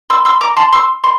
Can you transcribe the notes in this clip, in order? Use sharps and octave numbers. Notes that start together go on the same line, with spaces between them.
C6 E6
C6 E6
A#5 D6
A5 C6
C6 E6
C6